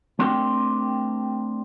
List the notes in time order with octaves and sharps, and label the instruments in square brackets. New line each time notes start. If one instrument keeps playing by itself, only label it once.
[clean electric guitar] A3 C4 D4 G4 A#4 G5